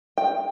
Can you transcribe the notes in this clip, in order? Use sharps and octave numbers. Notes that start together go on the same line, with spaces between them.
G5